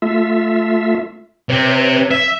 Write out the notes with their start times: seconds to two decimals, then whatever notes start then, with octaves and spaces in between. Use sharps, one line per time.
0.02 A3 F4 E5
1.49 C3 C4 B4 C#5
2.11 E5